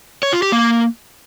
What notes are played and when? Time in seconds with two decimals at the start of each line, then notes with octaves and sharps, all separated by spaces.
0.23 C#5
0.33 F4
0.43 G4
0.52 A#3